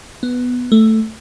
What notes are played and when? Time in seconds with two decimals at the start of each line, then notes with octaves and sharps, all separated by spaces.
0.23 B3
0.72 A3